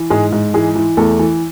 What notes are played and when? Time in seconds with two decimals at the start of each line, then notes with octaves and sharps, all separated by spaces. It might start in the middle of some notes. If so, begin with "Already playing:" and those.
Already playing: E3
0.10 G#2 G#3 G#4
0.32 G#2
0.54 E3 G#3 G#4
0.75 E3
0.97 E2 A3 A4
1.19 E3